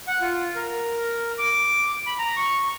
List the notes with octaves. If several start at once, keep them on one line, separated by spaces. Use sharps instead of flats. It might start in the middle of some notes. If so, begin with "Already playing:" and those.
F#5
F4
A#4
D6
B5
A#5
C#6